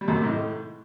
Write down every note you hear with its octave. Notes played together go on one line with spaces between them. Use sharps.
G3
F#2
C3
G#2
A2